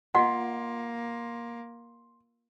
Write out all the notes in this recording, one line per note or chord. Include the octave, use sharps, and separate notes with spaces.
A#3 F4 D#5 F#5 C6